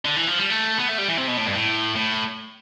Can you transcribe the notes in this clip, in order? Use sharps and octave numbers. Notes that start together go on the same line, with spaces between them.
D3
E3
F3
G3
A3
B3
A3
G3
E3
C3
B2
A2
G2
A2
A2